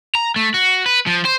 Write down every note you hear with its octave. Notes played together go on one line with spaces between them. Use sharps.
A#5
A3
F#4
B4
F3
C5